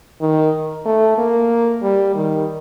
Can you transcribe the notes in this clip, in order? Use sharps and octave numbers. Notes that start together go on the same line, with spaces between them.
D#3
A3
A#3
G3
D#3